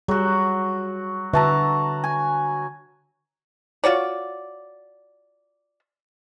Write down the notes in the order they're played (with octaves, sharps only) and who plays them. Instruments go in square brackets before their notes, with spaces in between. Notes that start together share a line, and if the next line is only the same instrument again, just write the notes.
[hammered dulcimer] F#3 F#4 [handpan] G3 G#4
[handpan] D3 B4 E5 [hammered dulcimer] F#4 A5 A#5
[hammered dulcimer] G#5
[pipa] F4 F#4 C#5 D5